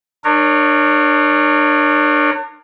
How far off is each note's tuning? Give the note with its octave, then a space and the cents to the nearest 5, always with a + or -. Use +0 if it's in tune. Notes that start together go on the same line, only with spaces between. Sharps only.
D4 +35 A#4 +0 C#5 +0